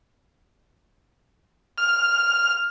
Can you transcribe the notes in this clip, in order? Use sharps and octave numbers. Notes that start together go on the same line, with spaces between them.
F6